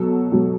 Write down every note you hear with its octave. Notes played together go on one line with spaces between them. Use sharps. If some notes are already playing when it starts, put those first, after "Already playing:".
Already playing: B2 F#3 A4
B2 F#3